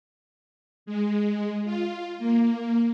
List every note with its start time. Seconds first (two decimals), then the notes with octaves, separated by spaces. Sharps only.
0.86 G#3
1.65 F4
2.18 A#3